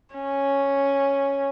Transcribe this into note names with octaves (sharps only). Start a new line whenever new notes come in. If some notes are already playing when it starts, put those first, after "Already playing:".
C#4